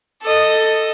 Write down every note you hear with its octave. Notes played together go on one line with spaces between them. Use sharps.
A4 D#5